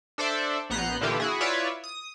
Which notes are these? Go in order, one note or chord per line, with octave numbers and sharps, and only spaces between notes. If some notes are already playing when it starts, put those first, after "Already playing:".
D4 A4 C5 D5 E5
A#1 B3 A#5 F#6 G6 C7
A#2 D3 E3 E4 F4 G4
E4 F#4 G#4
E4 F4 B4 C#5 D5 E5
D#6